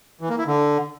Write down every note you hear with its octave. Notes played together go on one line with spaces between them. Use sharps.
E3
A#3
E4
D3